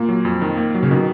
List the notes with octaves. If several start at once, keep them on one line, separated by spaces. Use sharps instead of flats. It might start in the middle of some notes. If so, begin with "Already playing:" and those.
Already playing: A#2 A#3
F#3
F2
D#3
A#3
F#3
C#3
B2 D#3